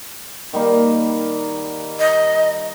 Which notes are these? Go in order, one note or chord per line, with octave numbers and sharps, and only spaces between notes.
D#3 G3 A#3
D#5